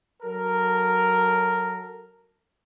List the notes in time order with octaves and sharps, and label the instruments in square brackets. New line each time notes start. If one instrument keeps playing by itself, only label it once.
[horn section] F#3 A4 A#4